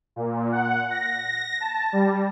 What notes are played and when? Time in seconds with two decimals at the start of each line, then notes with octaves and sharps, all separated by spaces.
0.16 A#2
0.52 F#5
0.90 A#6
1.61 A5
1.93 G3